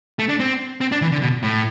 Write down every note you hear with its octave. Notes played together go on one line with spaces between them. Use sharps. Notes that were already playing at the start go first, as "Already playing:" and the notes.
A3
D4
C4
C4
D4
E3
D3
B2
A2